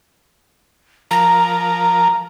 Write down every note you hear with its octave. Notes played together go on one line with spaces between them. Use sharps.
F3 A#4 A#5